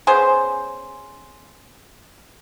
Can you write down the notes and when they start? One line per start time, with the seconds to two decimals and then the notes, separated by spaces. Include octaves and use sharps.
0.07 B3 C#4 G#4 C5